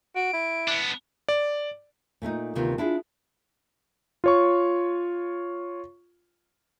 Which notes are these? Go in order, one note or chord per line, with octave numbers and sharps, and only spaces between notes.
F#4 D7
E4
B3 D4
D5
A#2 A3 C#4 D#4
D2 C3 D#3 B3 F4
D4 E4 F4 G#4
F4 C#5 C#6